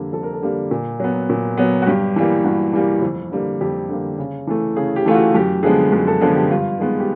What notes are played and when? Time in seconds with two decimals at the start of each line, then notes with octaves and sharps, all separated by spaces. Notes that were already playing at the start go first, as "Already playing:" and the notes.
Already playing: F2 D3 G3 A#3
0.13 F2 A4
0.23 A#4
0.33 A4
0.42 D3 G3 A#3
0.71 A#2
1.00 F#3 B3
1.29 A#2
1.57 F#3 B3
1.82 F#4
1.87 G2 G4
2.16 E3 G3 A#3
2.44 G2 F#4
2.73 E3 G3 A#3
3.02 F2
3.31 D3 G3 A#3
3.61 F2 G4
3.89 D3 G3 A#3
4.18 C#3
4.47 E3 A3
4.76 C#3 G#4
4.96 G4
5.06 E3 A3 F4
5.15 F#4
5.35 F#2 G4
5.63 D3 F3 G#3 B3 G#4
5.92 F#2
6.07 A4
6.21 D3 F3 G#3 B3 G#4
6.35 G4
6.50 G2 F4
6.79 D#3 G#3 B3
7.00 G4